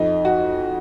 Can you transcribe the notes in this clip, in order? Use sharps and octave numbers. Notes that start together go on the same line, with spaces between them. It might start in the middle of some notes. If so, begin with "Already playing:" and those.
Already playing: F2 D#4
F#4